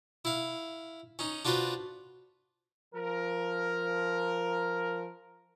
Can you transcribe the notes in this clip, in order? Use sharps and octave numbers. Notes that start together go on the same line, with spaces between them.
E4 F5
C#4 D#4
D4 F4 F#4 B4 C5
F3 A#4